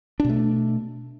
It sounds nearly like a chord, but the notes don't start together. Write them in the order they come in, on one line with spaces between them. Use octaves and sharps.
D4 B2 A3